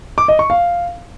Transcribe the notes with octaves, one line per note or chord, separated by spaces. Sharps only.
D6
D#5
C#6
F5